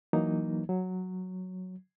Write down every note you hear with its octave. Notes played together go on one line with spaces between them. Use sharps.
E3 F#3 A#3 D#4
F#3